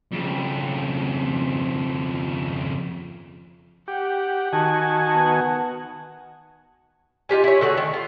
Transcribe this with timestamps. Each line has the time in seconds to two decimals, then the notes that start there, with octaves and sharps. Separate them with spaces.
0.12 F2 C#3
3.88 G4 F#5
4.53 D#3 F#4 G#5 A5
5.08 B3 F#5
7.29 D#4 F4 G4 G#5
7.44 E4 C#5
7.61 D3 A3 F#4 G#4
7.77 D#3
7.94 F4